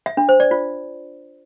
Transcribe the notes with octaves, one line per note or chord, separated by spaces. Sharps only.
E5
D4
C5
D5
F4